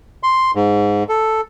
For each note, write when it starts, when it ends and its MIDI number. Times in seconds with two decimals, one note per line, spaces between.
0.23 0.51 84
0.55 1.03 44
1.09 1.41 69